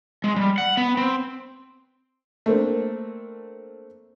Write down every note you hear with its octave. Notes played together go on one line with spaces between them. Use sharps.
G#3
G3
F#5
B3
C4
A3 A#3 C4 D4